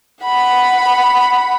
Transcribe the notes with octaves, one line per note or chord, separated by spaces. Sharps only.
F#5 B5